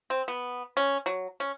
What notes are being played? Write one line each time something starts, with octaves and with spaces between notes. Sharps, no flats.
C4
B3
C#4
F#3
C#4